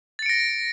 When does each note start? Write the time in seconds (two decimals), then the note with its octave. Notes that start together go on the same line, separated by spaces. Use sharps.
0.19 A6
0.22 C#7
0.26 D7
0.29 A#6